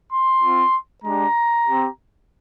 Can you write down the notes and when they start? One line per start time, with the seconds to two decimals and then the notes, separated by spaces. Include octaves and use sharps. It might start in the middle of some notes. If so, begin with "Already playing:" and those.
0.11 C6
0.42 C4 F4
1.04 G#3 D4 G4 A#5
1.66 C4 G4